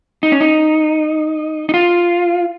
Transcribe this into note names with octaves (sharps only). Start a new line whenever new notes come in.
D#4
C#4
D#4
D#4
F4